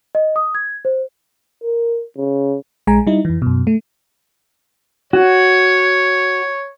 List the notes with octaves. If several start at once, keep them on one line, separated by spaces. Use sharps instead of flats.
D#5
D#6
G#6
C5
A#4
C#3
A#1 G#3 G#5 A#5
G3 D#4 E4
F2 E3
F#2 B2
A3
F#4 C#5